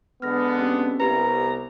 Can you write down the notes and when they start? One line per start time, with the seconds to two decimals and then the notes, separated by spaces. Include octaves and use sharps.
0.22 D3 G#3 B3 F6 A#6
0.59 C4 C#4 G4
1.00 C2 B3 G4 B4 A#5